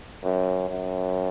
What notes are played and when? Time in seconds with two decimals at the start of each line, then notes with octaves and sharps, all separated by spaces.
0.23 F#2
0.69 F#2